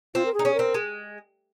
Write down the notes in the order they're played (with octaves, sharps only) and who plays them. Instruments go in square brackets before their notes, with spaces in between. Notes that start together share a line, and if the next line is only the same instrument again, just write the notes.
[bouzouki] C4 [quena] F4
[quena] A#4
G#4
[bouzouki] D#4
C#4
[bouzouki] C4 [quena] A#4
[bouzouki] G#3